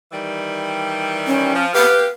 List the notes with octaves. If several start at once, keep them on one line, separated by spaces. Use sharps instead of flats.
D#3 E3 G3
C#4
F3
G4 B4 F5